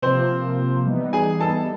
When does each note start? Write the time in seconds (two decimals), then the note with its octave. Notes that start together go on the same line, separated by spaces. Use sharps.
0.02 C3 F3 A#3 C4 C5
0.85 E3 G3 B3 D#4
1.13 G#4 G#5
1.41 A4 A5